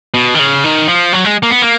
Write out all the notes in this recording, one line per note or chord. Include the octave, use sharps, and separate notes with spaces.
B2
D#3
C#3
D#3
F3
F#3
G#3
A#3
B3
A#3